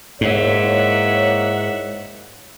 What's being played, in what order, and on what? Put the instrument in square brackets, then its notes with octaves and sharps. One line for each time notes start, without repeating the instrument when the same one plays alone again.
[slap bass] G#2 [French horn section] A#3 E4 C#5 [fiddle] E5 F#5